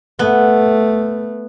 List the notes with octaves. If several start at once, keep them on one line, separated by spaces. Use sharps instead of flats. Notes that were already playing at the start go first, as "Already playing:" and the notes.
A3 B3